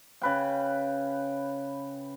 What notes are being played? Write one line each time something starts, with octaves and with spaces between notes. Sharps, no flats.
C#3 B4 G5